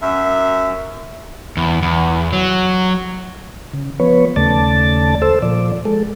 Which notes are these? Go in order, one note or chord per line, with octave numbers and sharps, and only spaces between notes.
F#2 E5
E2
E2
F#3
C#3
F3 B3 B4 C#5
D#2 C#3 A3 D5 A5 A6
A4 C5 E6
A#2 F3 D5
G#3 A4